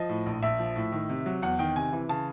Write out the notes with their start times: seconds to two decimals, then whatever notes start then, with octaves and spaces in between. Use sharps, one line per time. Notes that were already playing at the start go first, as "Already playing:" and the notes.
Already playing: F3 D#5
0.09 A2
0.26 A#1
0.43 A#1 E5
0.59 F3
0.76 A2
0.92 D#3
1.09 C3
1.26 F#3
1.42 E2 F#5
1.59 D#3 G5
1.76 C3 G#5
1.93 E3
2.09 C#3 A5